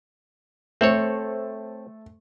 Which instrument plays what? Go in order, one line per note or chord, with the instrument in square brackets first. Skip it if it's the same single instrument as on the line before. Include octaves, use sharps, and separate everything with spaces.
[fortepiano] A3 C5 [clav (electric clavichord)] C4 A4 C#5